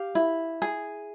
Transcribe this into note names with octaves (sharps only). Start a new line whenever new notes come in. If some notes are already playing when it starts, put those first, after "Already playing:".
Already playing: G4 F5
E4
G#4